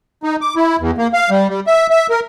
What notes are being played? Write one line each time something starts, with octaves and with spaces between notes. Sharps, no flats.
D#4
D6
E4
E2
A#3
F5
G3
G3
E5
E5
A#4